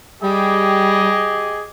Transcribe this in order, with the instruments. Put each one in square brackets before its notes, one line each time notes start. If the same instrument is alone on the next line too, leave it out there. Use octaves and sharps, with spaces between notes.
[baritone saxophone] G3 [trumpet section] G4 G#4 D#5